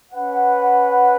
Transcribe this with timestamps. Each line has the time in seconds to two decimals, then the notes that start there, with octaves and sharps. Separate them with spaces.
0.11 C#4 B4 F#5